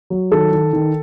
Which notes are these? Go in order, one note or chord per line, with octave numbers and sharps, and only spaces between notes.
F#3
D#3 A4
D#3
D#3